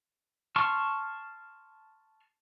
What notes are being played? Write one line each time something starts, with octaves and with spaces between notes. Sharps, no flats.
A5 C6 C#6 F6